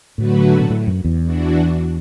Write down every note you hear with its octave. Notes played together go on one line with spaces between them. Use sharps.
A2 D3 F#3 A3 F#4 B4
B2
A2
F#2
E2
E3 D4 F#4